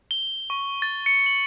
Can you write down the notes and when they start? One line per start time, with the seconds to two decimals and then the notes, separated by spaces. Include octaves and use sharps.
0.11 G7
0.50 C#6
0.82 A6
1.06 C#7
1.26 F#7